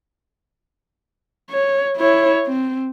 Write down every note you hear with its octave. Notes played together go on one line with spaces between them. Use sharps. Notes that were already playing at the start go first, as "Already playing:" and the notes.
C#5
E4 C#5
C4